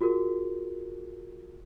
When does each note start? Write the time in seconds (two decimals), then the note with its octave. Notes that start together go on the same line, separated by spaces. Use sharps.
0.01 F4 F#4 G#4 A#4